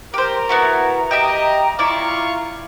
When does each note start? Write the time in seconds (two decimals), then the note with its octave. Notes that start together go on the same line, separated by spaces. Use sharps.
0.14 G4 A#4 C5
0.49 B3 E4 F#4 A#5
1.11 G4 D#5 E5 G5
1.79 E4 F4 D5 F5 C#6